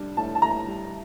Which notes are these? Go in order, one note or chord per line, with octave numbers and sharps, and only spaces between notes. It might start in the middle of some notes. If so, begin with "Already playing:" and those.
Already playing: G3 D4
A2 A5
A5
A2 A#5
G3